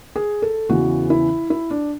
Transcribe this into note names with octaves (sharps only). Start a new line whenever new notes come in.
G#4
A4
E2 C#3 E3 F#4
E4
E4
D4